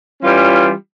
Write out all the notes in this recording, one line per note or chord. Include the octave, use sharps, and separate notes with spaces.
E3 G3 C#4 F4